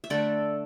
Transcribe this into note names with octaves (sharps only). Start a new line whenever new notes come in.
E5
D3 A3 A4 D5